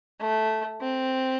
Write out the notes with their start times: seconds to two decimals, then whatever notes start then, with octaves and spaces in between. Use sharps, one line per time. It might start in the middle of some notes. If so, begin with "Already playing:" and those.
0.20 A3
0.81 C4